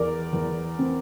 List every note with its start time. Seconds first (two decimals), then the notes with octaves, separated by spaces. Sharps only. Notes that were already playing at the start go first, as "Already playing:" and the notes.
Already playing: E2 A#4 D5
0.33 E2
0.79 C4